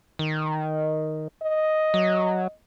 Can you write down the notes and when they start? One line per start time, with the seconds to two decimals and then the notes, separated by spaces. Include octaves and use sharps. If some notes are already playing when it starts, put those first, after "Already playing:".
0.19 D#3
1.42 D#5
1.94 F#3